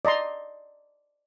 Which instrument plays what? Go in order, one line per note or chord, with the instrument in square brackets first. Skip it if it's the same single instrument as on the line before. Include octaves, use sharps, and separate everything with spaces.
[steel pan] D5 D#5 A#5 C6